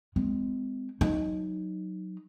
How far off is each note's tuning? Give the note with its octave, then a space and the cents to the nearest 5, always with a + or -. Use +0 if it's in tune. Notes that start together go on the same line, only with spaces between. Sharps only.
G#3 -5 C4 -30
F#3 +0 D#4 +0